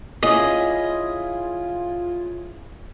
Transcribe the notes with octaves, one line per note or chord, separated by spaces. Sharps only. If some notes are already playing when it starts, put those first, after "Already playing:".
C#4 E4 F4 G#4 D#5